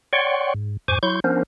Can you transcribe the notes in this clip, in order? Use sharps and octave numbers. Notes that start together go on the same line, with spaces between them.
C#5 D5 F#5 G5 C6 C#6
G#2
F2 G#2 C5 G#5 C#6 D6
F#3 E4 C6 C#6 G6
F3 B3 C#4 D4 A#4 C5